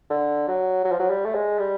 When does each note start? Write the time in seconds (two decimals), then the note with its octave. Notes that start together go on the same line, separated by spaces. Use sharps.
0.10 D3
0.48 F#3
0.85 F#3
0.92 F3
1.00 F#3
1.10 G3
1.26 A3
1.35 G#3
1.59 G3